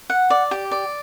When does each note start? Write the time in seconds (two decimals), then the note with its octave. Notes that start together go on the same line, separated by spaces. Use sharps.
0.10 F#5
0.30 D5
0.51 G4
0.71 D5